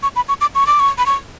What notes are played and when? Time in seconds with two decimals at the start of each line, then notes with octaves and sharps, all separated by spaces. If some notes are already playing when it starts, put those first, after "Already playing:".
0.03 C#6
0.16 B5
0.28 C#6
0.41 D6
0.55 C#6
0.67 D6
0.80 C#6
0.98 B5
1.06 C#6